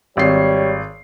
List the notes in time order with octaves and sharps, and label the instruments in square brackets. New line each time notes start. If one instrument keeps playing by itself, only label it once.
[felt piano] G#1 C7 [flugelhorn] G3 [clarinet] C#5